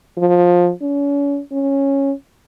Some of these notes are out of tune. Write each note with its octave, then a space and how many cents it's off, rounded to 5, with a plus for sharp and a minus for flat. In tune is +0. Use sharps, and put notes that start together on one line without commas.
F3 +15
C#4 +40
C#4 -10